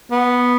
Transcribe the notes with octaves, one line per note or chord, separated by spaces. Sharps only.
B3